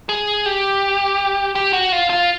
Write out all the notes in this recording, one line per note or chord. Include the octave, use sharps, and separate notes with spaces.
G#4
G4
G4
F#4
F4
F4